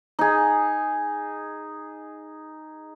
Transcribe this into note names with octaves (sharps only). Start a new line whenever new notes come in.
D#4 G#4